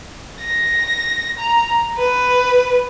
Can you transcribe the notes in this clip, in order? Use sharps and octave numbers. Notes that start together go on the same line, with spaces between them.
A#6
A#5
B4